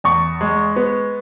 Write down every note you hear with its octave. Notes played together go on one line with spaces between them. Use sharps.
E2 C#6
G#3
B3